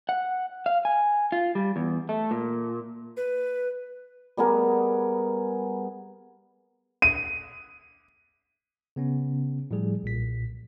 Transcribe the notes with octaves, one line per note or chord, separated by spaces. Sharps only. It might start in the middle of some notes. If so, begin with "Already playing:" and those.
F#5
F5
G#5
F4
G3
E2
A3
A#2
B4
G3 B3 G#4 A#4
D#7
C#3 B3 C#4
A2 F3 G3 G#4
B1 A#2 B6